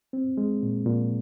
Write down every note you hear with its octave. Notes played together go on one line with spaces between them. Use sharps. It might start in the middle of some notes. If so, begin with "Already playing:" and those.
C4
G#3
A#2
A#2